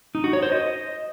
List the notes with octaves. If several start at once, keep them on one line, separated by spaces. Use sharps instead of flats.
D#4
F#4
C#5
C5
D#5